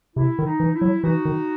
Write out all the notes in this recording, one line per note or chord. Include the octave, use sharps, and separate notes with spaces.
C3 E4
D#3
D#4
E3
E4
F#3
E3 D#4 F#4
D#3